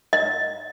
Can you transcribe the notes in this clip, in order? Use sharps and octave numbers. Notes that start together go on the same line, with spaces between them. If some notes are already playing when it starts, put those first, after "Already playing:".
D#5